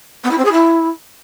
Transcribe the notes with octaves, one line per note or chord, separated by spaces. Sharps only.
B3
E4
C4
G#4
E4